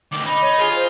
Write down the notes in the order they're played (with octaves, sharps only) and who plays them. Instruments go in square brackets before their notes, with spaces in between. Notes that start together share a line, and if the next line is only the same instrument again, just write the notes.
[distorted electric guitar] D2 D#3 [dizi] D6
[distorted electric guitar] D#4 [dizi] B5
[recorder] C#5
[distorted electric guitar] F4 [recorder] G#4
[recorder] C5